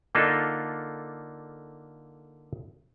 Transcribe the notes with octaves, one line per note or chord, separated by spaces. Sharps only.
D3 A#3 D4 D#4 F4 A4